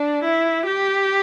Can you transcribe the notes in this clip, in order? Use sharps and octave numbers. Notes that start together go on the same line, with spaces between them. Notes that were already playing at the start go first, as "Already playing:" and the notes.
Already playing: D4
E4
G4